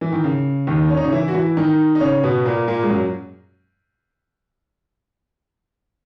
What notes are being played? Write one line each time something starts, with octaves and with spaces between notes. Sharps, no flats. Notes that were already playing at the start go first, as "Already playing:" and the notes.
E3
D#3
C#3
D#2 D#3
C#4
D#4
C#3 C#4
E3 E4
F#4
E3 E4
D#3 D#4
D#4
C#3 C#4
B2 B3
A#2 A#3
A#2 A#3
G#3
F#2 F#3